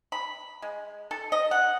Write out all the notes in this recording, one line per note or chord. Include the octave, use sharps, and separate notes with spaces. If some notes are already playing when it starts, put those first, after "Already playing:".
B5
G#3
A4
D#5
F#5